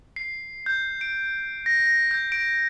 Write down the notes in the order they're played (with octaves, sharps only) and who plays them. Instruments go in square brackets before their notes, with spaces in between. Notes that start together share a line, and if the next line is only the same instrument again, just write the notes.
[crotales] C7
G6
D7
A#6
A#6
G6
D7